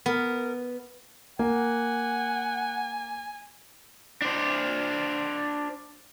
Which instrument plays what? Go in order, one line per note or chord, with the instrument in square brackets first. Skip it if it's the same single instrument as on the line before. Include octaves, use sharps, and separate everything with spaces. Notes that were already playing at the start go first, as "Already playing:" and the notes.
[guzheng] B3 [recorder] A#4
[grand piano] A#3 [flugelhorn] F#5 [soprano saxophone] G#5
[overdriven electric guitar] D4 C5